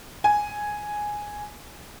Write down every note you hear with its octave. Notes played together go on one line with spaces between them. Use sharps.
G#5